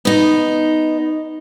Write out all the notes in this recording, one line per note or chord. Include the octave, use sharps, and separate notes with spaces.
B3 D#4